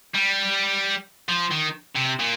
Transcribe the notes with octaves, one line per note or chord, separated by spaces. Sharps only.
G3
F3
D#3
C3
A#2